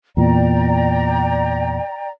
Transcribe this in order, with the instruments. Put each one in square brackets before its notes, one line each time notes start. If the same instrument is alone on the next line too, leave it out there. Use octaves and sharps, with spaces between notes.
[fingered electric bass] E2 A#2 [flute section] D5 G5 A#5